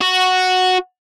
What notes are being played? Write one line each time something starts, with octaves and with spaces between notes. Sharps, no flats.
F#4